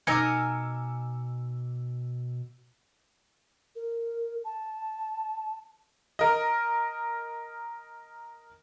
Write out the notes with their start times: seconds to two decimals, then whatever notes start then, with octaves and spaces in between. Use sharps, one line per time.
0.07 B2 D#4 A#4 G#5 D6 E6 C#7
3.76 A#4
4.44 A5
6.19 A#4 D#5